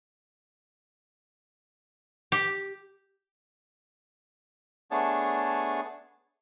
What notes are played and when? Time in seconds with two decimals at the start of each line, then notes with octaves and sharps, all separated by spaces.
2.32 G4
4.91 A3 B3 D4 G#4 C#5 A5